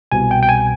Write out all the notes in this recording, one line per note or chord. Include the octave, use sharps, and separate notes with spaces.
C2 B2 G#5
G5
G5
G#5